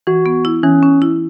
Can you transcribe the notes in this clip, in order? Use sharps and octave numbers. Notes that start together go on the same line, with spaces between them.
E3 F#4
B3
E4
E3 C#4
C#4
E4